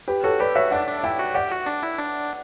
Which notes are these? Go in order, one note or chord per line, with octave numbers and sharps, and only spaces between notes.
G4 B4
F#4 A4 C#5
G4 B4 D5
F#4 C#5 E5
D4 D5 F#5
D4
E4 E5 G5
F#4
G4 D5 F#5
F#4
D4
E4
D4